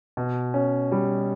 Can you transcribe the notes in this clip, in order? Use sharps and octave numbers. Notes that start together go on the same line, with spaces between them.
B2
C#4
G3